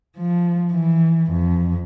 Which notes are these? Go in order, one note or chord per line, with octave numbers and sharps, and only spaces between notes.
F3
E3
F2